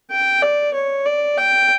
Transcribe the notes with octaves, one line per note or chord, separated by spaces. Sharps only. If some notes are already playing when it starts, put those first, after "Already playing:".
G5
D5
C#5
D5
G5